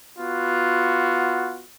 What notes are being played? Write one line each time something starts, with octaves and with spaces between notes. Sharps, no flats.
B3 F4 F#4